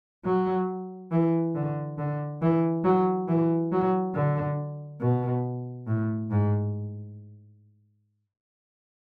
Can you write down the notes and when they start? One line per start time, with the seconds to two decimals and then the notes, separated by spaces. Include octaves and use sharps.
0.25 F#3
1.12 E3
1.55 D3
1.98 D3
2.41 E3
2.84 F#3
3.28 E3
3.72 F#3
4.15 D3
5.01 B2
5.87 A2
6.31 G#2